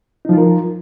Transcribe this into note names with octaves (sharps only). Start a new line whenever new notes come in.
F3 D#4 F4 A#4